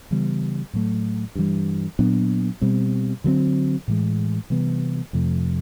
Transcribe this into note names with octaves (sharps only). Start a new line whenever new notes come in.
C#3 E3 G3 B3
A2 F#3 A3
G2 E3 G3
A#2 F#3 B3 D4
B2 G3 C4
D3 F#3 A3 C4
A2 E3 G#3
C3 E3 G3 B3
F2 C3 F3 A3